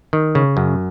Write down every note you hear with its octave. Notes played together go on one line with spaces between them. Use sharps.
D#3
C#3
F#2